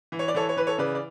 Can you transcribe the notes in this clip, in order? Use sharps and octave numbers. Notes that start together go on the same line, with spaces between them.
E3
C#5
D5
E3 A4 C#5
C#5
E3 B4
A4 C#5
C#3 B4 D5
D5